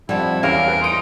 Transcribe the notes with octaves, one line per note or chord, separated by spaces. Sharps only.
F2 G3 E4 F#5
E2 G3 C#4 A#4 F5
B4
D#4 C6 D7